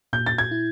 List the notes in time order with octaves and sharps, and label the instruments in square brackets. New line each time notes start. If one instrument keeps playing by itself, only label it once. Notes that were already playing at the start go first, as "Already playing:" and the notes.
[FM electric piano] A#2 [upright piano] G6
[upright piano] A6
G#6
[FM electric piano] E4